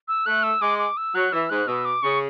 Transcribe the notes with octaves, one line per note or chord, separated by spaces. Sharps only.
E6
A3 F#6
E6
G#3 D6
D6
E6
F#3 F#6
E3 E6
G#2 F#6
B2 E6
D6
C#3 C#6